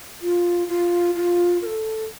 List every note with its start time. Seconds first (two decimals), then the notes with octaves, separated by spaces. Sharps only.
0.22 F4
0.69 F4
1.16 F4
1.62 A#4
1.66 A4